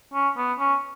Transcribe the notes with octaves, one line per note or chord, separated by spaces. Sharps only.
C#4
B3
C#4